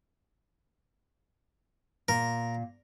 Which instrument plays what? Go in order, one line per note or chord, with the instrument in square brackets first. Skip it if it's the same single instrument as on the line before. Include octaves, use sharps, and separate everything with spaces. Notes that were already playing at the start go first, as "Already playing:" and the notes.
[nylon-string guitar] A#2 [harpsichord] A#4